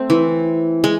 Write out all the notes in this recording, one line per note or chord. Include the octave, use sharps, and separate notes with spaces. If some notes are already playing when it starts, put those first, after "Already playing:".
Already playing: A3 C4
E3
G#3